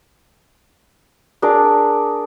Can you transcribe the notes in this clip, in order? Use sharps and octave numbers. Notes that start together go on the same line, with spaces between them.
D4 G#4 A#4 D5